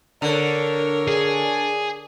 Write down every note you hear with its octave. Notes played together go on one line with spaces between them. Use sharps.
D3 A#4 C#5 D5
D4 G#4